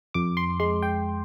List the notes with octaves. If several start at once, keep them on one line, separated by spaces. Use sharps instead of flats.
F2 D6
C6
G#3 C6
G5